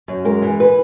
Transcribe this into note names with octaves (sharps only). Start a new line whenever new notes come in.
F#2
G#3 A#4
E3
B4